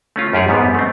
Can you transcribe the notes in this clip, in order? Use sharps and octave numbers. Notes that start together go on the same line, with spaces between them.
A3 C#4 F4
F#2 G4 G#4 C#5
G#2 G3 B3
A3 C4